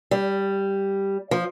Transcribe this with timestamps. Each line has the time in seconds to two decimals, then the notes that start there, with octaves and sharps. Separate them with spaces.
0.11 G3
1.31 F3